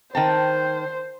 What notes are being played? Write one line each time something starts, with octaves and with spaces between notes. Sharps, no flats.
D#3 C5 G5 A5